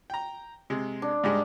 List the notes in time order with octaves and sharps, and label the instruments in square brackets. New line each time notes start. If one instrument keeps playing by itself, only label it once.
[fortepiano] G5 A#5
C3 G#3
[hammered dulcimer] D4
[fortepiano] G#2 G3 G#3